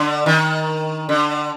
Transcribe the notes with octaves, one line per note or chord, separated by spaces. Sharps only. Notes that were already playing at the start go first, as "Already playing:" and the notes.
Already playing: D3
D#3
D3